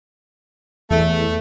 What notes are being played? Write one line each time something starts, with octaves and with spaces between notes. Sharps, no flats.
E2 A3